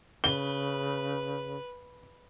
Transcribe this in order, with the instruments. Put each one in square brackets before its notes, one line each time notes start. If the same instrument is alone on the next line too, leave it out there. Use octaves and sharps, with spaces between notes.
[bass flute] C#3 [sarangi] B4 [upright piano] G7